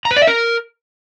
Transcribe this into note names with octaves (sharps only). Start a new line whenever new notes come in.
A#5
B4
D5
E5
A#4